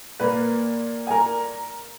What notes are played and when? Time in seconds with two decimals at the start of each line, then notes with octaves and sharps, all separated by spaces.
0.20 A#2 A#3 B4
1.07 G#5
1.11 A#4 A#5